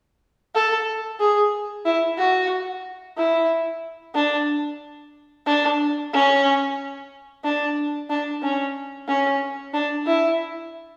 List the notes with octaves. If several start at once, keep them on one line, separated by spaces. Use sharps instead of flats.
A4
G#4
E4
F#4
E4
D4
D4
C#4
D4
D4
C#4
C#4
D4
E4